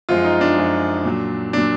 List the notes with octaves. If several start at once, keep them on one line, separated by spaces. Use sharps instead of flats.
F#2 F3 G#3 F4
D#4
D4
F#2 F3 G#3
A#2 F#3
A#2 F#3 D4